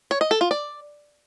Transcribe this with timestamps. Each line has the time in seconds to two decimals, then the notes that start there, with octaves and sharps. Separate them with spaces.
0.11 C#5
0.21 D#5
0.31 A4
0.41 F4
0.51 D5